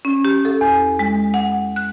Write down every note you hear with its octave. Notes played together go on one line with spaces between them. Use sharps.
C#4
G4
A4
E2
G#3
F#5
F#6